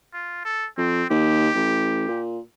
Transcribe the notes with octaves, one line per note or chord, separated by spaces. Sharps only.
F4
A4
F2 C4
D#2 G4
A1
A#2